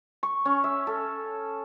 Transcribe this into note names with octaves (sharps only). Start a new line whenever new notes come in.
C#6
C#4
E5
A4